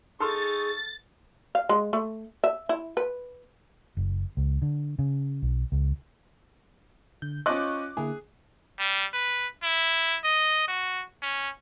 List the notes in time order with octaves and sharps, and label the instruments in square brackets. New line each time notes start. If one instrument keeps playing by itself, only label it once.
[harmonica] D#4 C#6 [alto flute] G#4 [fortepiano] A4 C6 F6 [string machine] A6
[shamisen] F5
G#3
A3
E5
E4
B4
[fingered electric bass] F#1
C#2
D3
C#3
B1
C#2
[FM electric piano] D3 G6
[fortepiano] C#4 F4 D#5 [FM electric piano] C5 C#6 G6 [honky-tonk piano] D6 F#6
[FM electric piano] D3 A#3 E4 [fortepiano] G#4
[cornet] G3
B4
E4
D#5
F#4
C#4